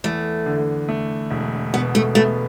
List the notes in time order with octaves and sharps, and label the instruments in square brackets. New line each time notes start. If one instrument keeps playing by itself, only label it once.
[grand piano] E2 [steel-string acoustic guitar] A3
[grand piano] D3
A3
E1
[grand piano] B2 [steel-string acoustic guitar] B3
[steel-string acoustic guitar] A3
[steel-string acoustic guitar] A3 [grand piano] B3